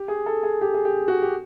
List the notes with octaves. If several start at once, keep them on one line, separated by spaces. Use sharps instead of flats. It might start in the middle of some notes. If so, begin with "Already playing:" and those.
Already playing: G4
G#4
A4
G#4
G4
G#4
G4
F#4
G4